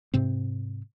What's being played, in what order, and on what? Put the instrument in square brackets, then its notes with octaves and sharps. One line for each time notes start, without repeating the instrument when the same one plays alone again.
[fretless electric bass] G#2 C3 C4